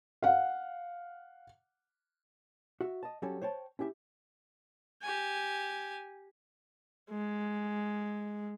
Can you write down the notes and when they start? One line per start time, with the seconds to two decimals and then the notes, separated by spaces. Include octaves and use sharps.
0.22 F5 F#5
2.81 F#4 E5
3.03 D#5 A5
3.22 F#3 G3 C#4 F#4 A4
3.42 C5 C#5 G5 A5
3.79 C#4 E4 G4 E5
5.02 G4 G#5
7.10 G#3